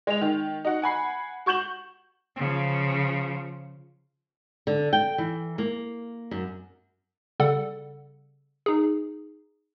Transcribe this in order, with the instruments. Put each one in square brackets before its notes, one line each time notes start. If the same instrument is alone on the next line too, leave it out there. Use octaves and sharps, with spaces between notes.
[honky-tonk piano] G#3 F7
D#3
D#4 F#4 F#5
F#5 G#5 B5 C7
F#4 C#6 G6 E7 F#7
[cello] C#3 F3
[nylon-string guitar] D3
G5
E3
A#3
F#2
[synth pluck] C#3 G3 A4 D5 F#5
D#4 G#4